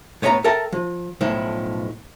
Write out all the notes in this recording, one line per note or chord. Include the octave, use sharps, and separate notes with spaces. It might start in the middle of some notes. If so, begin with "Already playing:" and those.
A2 B3 C#5 E5 A5 A#5
A4 A#4 E5 G5 A5
F3
B1 A2 F3 E4